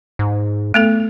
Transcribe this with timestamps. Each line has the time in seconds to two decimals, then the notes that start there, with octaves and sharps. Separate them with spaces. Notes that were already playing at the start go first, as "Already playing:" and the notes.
0.19 G#2
0.74 A3 B3 A4